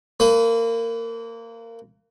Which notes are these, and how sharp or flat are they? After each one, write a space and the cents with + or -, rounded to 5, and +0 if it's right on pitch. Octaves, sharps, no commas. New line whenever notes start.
A#3 -25 B4 +25